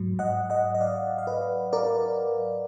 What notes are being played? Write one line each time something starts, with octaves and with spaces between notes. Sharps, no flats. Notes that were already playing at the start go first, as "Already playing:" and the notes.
Already playing: G#2 F#3
D#5 F#5
D#5 F#5
D#5
D5 F5
F5
B4 D#5
A#4 D5